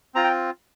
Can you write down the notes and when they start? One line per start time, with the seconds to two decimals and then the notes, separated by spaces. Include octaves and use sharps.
0.15 C4 F4 A#5
0.24 G5